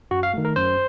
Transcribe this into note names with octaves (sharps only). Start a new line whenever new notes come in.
F#2 F#4
F5
D#3 A3
A#4
F#2 C5